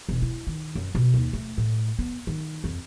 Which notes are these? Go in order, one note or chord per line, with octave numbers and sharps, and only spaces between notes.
E1
E4
D#3
F#2
B2
D#2
A3
A2
B3
D#3
F2